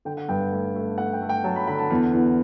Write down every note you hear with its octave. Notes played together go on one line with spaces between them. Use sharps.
D3 G5
F#5
G2 G5
F#5
A3
A3
A3 F#5
G5
A3
G5
F#3 A5
B5
D3 B5
A5
E2
E2